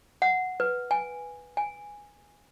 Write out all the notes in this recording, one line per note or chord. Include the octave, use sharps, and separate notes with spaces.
F#5
B4
G#5
G#5